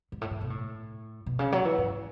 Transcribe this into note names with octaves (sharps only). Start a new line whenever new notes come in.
G#2
A2
G#2
B2
A2
B2
C#3
F#3
E3
G#2